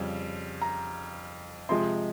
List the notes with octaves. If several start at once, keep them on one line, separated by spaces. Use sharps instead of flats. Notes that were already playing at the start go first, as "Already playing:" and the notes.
Already playing: F2 C#3 G3
A#5
C3 F3 G#3 C6